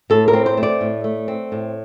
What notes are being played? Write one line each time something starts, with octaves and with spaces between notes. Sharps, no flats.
A2 A4
A#4
C4
C5
A3
D5
A2
A3
C4
A2